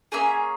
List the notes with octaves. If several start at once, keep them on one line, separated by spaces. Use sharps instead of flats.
A#3 C#4 G#4 E5 G#5